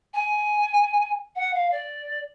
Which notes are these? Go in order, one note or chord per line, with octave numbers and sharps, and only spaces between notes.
G#5
F#5
F5
D5